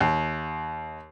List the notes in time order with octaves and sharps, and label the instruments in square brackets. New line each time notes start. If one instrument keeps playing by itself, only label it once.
[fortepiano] D#2